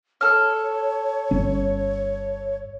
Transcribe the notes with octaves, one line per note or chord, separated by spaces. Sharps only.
A4 C#5 F6
G1 C#4